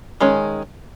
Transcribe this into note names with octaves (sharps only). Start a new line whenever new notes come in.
D#3 G#3 C#4